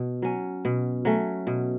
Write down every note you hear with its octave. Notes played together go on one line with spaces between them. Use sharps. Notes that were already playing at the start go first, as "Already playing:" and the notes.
Already playing: B2
F#3 C#4
B2
F#3 A3 C#4
B2